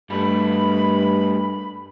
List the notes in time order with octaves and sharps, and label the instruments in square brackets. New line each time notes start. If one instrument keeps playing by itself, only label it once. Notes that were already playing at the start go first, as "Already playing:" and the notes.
[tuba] G2 [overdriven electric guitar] G3 A3 [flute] B5